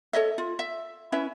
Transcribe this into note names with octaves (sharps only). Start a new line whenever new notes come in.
A4 C#5 D#5 E5
F4
E5
C#4 E4 B4 E5